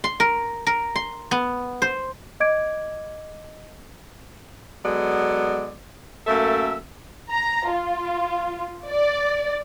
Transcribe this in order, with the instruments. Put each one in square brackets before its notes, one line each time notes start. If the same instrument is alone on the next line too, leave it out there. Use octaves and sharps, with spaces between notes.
[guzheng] C6
A#4
A#4
C6
B3
C5
[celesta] D#5 D6 G#6 D7
[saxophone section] F#3 G#3 B3 A4 D5
F#2 A3 A#3 A4 E5
[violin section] A#5
F4
D5